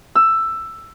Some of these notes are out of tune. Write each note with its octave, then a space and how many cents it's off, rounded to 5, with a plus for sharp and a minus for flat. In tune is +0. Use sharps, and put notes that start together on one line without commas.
E6 +10